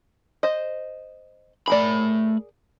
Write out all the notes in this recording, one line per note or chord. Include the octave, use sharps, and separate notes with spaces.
C5 D#5
A3 G#4 A#4 D5 B5